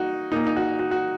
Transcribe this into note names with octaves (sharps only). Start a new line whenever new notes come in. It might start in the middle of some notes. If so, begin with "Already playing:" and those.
Already playing: A#3 D#4 F#4
A#2 A#3 D#4
D#4
F#4
F#4
F#4